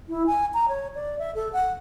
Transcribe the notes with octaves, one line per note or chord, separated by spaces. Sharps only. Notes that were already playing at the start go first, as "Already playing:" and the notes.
E4
G#5
A#5
C#5
D5
E5
A4
F#5